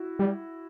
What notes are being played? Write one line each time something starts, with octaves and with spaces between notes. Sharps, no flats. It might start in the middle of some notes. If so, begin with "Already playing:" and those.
Already playing: E4 F#4
G3